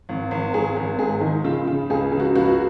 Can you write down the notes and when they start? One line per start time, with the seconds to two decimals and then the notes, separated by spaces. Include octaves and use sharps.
0.09 G#1
0.31 G#1
0.54 G#1 G#4
0.76 G#1
0.98 G#2 G#4
1.21 D#3
1.44 C#3 F4
1.67 C#3
1.90 C#2 G#4
2.12 C#3
2.20 F#4
2.35 C#2 F#4